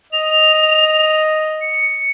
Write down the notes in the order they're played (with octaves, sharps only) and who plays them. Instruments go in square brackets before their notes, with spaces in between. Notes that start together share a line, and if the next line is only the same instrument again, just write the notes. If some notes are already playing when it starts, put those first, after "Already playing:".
[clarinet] D#5 [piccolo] F7
[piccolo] C#7